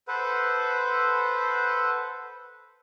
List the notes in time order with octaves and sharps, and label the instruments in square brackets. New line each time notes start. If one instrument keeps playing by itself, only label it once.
[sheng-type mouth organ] A4 B4 C5 F#5